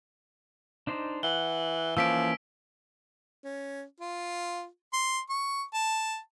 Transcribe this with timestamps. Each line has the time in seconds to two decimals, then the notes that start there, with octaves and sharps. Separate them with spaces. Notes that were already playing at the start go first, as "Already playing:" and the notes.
0.87 D4 D#4 C5
1.23 E3 F#5 G7
1.97 E3 F3 A#3 C#4 E6 B6 D7
3.44 C#4
4.00 F4
4.93 C6
5.29 C#6
5.73 A5